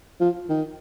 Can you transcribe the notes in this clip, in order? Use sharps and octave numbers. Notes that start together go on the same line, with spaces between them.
F3
D#3